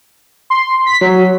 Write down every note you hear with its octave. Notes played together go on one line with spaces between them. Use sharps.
C6
B6
F#3